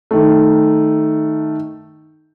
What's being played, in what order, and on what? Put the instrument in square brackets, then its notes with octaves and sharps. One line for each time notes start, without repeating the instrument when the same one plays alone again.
[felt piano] D#3 A3